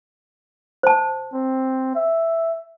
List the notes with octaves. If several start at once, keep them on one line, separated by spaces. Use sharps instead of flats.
C5 A5
C4
E5